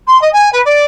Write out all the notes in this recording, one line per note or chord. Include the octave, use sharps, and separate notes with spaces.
C6
D#5
G#5
B4
D5